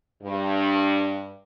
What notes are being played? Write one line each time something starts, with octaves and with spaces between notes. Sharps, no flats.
G2